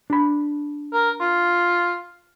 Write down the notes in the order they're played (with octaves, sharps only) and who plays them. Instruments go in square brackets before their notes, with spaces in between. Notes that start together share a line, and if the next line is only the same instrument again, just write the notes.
[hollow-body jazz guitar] D4 B5
[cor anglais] A#4
F4